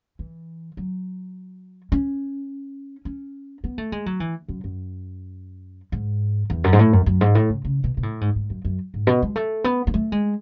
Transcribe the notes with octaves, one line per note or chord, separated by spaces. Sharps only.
E3
F#3
C#4
C#4
B3
A3
G#3
F#3
E3
F#2
F#2
G#2
E2
F#2
G#2
A2
F#2
F#2
G#2
A2
C#3
C#3
B2
B2
A2
G#2
G#2
F#2
F#2
G#2
B2
G#3
A3
B3
B3
A3
G#3